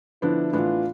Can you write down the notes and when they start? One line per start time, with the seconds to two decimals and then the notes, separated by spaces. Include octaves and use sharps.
0.22 D3 F3 B3 D4 E4
0.53 A2 E3 B3 D4 F4